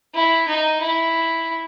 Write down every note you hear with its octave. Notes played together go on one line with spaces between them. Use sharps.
E4
D#4
E4